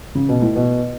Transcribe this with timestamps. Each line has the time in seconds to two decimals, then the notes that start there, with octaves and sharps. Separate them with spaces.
0.15 C#3
0.29 B2
0.42 A2
0.56 B2